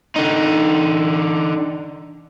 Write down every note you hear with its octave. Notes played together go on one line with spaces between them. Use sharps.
D3 D#4